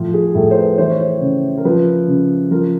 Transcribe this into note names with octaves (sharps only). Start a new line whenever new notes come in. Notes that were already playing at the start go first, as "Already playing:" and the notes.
Already playing: A2 F3
G#4
A2 A4
C5
B4
E3 C5
C#5
C5
C#3
A#4
F3 B4
C#3
F3 A#4